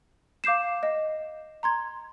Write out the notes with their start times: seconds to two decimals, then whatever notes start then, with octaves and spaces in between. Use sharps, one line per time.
0.44 F5 D6 G6 C7 E7
0.83 D#5
1.63 A#5 C6 G#6